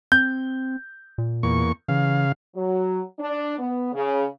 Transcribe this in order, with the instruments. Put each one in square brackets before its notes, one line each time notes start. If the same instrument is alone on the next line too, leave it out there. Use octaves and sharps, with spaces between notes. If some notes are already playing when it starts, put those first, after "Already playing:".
[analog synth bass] C4 [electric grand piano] G6
[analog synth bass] A#2
[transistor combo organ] E2 A#3 C#6
[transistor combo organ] C#3 F5 [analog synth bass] E3
[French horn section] F#3
D4
B3
C#3